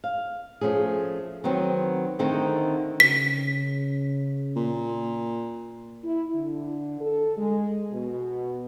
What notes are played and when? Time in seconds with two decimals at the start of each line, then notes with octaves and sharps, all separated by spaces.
0.04 F5
0.61 F3 A3 C#4 G#4
1.44 D#3 F#3 B3 C4
2.19 D3 D#3 A3 C4 D#4
3.00 C#3 B6
4.56 A#2
6.03 E4
6.35 D3
7.00 A4
7.37 G#3
7.92 B2